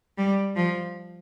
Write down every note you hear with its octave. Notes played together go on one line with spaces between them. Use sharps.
G3
F3